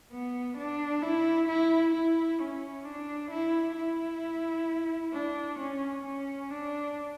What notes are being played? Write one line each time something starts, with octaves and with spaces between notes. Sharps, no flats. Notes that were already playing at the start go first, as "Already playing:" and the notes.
B3
D4
E4
E4
E4
C#4
D4
E4
E4
D4
C#4
C#4
D4